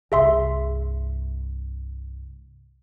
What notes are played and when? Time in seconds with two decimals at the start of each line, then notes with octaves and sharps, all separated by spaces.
0.12 C2 G2 G#4 E5 C6